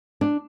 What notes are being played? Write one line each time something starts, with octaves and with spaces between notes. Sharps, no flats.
D4